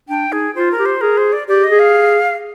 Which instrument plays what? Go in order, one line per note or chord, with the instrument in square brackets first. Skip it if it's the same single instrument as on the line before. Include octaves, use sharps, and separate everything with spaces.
[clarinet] D4 [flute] G5
[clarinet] D#4 [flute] G#4
[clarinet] F4 [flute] C5
[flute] A#4
[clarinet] G4
[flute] C5
[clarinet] G#4 [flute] A#4
[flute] C5
D5
[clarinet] G4 [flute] D5
[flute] D#5
[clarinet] G#4
[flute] F5